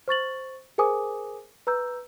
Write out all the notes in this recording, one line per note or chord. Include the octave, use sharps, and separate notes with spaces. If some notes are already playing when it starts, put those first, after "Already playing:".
C5 C#6 A6 F#7
G#4 A#4 C5 G#5 D6 D#6
B4 A#5 E6 G6